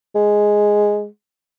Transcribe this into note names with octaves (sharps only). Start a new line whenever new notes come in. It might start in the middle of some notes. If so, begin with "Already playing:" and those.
G#3